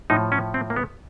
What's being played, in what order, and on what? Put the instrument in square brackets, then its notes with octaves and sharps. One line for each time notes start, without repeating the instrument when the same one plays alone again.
[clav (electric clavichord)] A2 F3 D#4
C#4
C4
A#3
B3